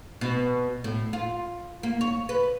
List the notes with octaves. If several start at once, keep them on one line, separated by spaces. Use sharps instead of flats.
B2
A2
F4
A#3
C#5
B4